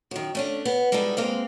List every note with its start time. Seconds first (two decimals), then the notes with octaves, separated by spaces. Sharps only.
0.11 F#2 D#3
0.35 A3 C#4 D4
0.65 B3
0.92 G3 G#3 D#4 E4 A4
1.17 G#3 A#3 C4 F5